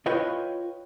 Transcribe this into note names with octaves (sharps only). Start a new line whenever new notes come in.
E4 F4 B4 C#5 D#5 G5